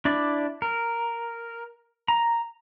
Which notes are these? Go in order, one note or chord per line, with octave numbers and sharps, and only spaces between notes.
D4 E4 D5
A#4
A#5